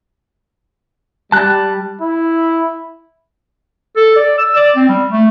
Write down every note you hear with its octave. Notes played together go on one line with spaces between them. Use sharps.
G3 A5 F#6
E4
A4
D5
E6
D5
C4
G3
A3